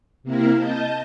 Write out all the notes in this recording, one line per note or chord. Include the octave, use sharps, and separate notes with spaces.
C3 A#3 C4 E4 A#4
D#5 A5 G6